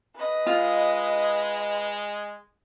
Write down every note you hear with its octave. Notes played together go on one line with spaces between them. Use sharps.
B4 D#5
G#3 F4